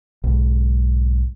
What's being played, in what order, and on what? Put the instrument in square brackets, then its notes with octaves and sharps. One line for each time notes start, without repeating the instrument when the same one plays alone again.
[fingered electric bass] B1 G#2